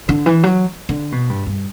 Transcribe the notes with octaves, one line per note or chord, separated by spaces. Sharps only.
D3
E3
F#3
D3
B2
G2
G2